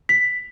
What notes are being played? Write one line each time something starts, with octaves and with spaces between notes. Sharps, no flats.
B6